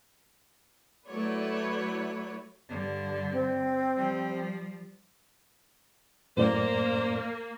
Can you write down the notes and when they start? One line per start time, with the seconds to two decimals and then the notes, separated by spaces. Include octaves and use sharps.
1.07 F#3 A3 E4 B4 C#5 D5
2.69 G2 D3
3.32 C4
3.95 F3 G3
6.37 F#2 A2 A#3 C5 D5